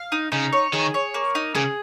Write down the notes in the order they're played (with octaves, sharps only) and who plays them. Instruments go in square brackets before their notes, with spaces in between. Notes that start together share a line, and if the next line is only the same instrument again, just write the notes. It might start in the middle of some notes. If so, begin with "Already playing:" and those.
Already playing: [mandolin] F5
D#4
[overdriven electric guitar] C#3 [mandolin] D#4
[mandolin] C#5
[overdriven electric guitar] D#3 [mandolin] G#4
[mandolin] C#5
A#3
D#4
[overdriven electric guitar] C#3 [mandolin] G#4